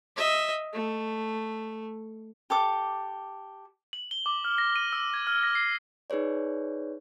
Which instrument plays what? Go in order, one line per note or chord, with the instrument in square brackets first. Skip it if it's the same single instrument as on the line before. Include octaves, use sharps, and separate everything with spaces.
[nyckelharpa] D#5 E5
A3
[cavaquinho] G4 A4 D6
[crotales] F#7
G7
D6
F6
A#6
D#7
E6
G#6
F6
A#6
C7
[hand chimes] D#4 G#4 B4 C#5 D5